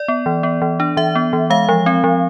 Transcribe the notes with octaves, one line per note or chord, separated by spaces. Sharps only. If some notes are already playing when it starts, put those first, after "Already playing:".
Already playing: D5
B3
E3
B3
E3
D4
E3 E5
B3
E3
G#3 F5
F3
C4
F3